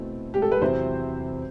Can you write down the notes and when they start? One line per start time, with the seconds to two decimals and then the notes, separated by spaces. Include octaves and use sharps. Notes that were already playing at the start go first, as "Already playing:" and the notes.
Already playing: B2 A3 C4 E4 A4
0.34 G4
0.42 A4
0.52 B4
0.61 E2 C3 F#3 C4 E4 C5